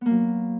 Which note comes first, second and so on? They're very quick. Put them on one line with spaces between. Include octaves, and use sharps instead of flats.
B3 A#3 F#3